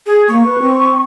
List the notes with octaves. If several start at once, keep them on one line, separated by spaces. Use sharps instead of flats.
G#4
A#3 C#6
B4
C4